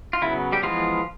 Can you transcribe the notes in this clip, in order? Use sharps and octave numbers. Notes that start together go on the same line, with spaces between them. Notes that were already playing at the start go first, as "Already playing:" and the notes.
F4
C#3 F#3 B3 E4
G3 G4
E3 F3 G#3 B3 F4